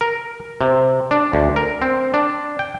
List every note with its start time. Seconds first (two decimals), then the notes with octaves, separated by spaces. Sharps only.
0.01 A#4
0.61 C3
1.11 D4
1.33 D2
1.56 A#4
1.82 C4
2.14 D4
2.59 G5